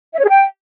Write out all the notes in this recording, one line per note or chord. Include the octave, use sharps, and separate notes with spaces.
E5
C#5
G#4
G5